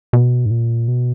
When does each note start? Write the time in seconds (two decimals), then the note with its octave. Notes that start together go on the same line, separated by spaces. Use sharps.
0.13 B2
0.46 G#2
0.51 A#2
0.88 B2